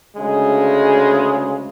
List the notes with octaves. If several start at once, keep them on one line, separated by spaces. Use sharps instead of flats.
D2 C#3 G#3